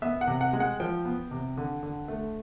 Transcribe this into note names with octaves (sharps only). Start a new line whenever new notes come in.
B3 E5
F#5
C3
F#5
G#3
F#5
F3 G5
B3
C3
D3
D3
A3